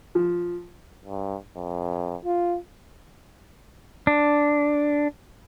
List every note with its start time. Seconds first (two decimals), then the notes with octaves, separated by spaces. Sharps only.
0.15 F3
1.05 G2
1.56 F2
2.25 F4
4.07 D4